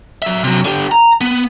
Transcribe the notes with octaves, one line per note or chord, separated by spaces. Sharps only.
F#3 E5
C3 F#3
D3 G4
A#5
B3